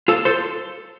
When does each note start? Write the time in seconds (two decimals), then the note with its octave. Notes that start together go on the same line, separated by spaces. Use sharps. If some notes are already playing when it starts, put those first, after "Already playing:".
0.08 F4 A4
0.25 A4 C5